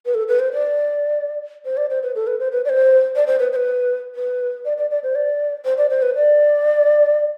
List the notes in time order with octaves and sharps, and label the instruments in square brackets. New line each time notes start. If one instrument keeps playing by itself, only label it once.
[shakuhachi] B4
A4
B4
C5
D5
C5
D5
C5
B4
A4
B4
C5
B4
D5
C5
D5
C5
B4
C5
B4
B4
D5
D5
D5
C5
D5
C5
D5
C5
B4
D5